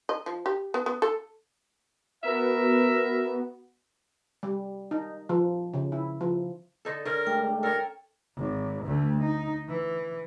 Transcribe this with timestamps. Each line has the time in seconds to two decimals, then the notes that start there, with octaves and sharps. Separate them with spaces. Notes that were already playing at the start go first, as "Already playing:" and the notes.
0.09 D#5
0.26 F3
0.46 G4
0.74 B3
0.86 B3
1.02 A4
2.24 B3 F#4 A#4 E5
4.43 G3
4.91 D#4
5.29 F3
5.74 C#3
5.92 E4
6.21 F3
6.85 D3 D#4 A4
7.05 D3 C#4 A#4
7.27 G#3 A3 D4 G5
7.63 A4 A#4 C#5
8.37 G#1
8.85 D2 A3
9.20 D#4
9.68 E3